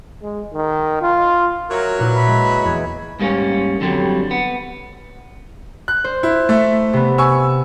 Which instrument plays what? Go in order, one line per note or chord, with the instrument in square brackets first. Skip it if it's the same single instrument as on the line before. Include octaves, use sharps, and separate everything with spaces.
[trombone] G#3
D#3
F4
[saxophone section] F#3 C#5 E5 [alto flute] A#4
[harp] A#2 E4 B4
[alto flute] B5
[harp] G#3
E2 G#6
[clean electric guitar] G#2 G3 A#3 B3 C#4
F2 D3 F#3 G3
B3
[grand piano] F#6
[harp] C5
[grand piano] E4
A3 E5
[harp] C3 B3
[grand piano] G#5 C#6 E6